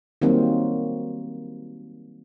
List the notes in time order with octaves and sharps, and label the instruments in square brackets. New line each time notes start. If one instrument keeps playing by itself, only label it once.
[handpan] D#3 F#3 G3 A#3 C4